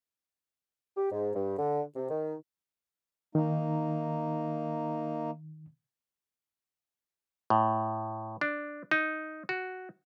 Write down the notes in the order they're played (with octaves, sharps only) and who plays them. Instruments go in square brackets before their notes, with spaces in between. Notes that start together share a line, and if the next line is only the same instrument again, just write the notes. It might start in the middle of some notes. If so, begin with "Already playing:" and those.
[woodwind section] G4
G#2
G2
D3
C3
D#3
[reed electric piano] D#3 [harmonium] A#3 D#4
[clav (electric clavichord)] A2
D4
D#4
F#4